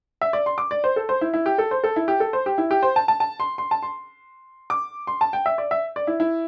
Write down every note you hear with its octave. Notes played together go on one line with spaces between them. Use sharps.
E5
D5
C6
D6
D5
C5
A4
C5
E4
E4
G4
A4
C5
A4
E4
G4
A4
C5
G4
E4
G4
C5
A5
A5
A5
C6
C6
A5
C6
D6
C6
A5
G5
E5
D5
E5
D5
E4
E4